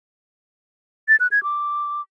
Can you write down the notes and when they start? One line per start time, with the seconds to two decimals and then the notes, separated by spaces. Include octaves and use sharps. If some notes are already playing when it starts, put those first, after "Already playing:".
1.08 A6
1.20 F#6
1.32 G#6
1.43 D6